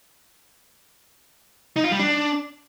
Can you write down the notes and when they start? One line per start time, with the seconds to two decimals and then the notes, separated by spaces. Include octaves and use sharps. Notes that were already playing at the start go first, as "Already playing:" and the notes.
1.76 D#4
1.84 F4
1.92 G3
1.99 D4